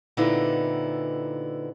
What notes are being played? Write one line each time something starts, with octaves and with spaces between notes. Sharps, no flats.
A#2 D3 B3 C4 D#4 E4